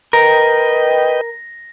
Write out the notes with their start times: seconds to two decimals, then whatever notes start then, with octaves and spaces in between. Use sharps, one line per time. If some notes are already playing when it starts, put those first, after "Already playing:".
0.13 A#4 B4 D#5 G5 A#6